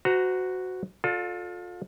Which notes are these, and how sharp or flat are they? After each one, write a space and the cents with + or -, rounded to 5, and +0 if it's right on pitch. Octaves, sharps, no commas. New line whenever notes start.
F#4 +0 C5 -35 A#5 +0
F4 +30 A4 +0 D5 +0